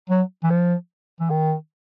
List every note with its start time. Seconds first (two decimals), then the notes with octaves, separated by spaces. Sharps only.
0.10 F#3
0.43 E3
0.50 F3
1.20 E3
1.30 D#3